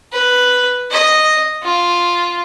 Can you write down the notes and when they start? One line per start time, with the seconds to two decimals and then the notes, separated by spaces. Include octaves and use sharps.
0.12 B4
0.91 D#5
1.63 F4